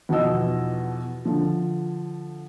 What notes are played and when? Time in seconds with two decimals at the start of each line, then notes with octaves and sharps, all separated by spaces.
0.09 E2 B2 F3 D#4 D#5 E6
1.25 D3 F3